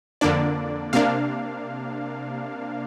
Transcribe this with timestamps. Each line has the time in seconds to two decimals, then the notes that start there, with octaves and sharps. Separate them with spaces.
0.21 F2 D3 A#3 D4 D5
0.93 C3 A#3 D4 F5